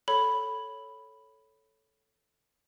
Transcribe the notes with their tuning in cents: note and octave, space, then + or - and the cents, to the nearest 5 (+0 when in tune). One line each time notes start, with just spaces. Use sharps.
A4 +0 C#5 +0 B5 +0